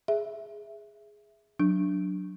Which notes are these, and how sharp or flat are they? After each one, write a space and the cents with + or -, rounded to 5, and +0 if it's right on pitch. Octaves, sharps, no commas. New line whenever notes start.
G#4 +0 E5 +0
F#3 +0 D4 +0